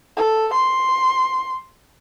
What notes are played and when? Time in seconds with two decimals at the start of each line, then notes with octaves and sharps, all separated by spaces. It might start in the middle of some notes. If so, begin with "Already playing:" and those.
0.17 A4
0.53 C6